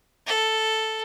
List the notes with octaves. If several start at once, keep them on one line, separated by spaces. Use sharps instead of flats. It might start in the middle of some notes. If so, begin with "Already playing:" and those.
A4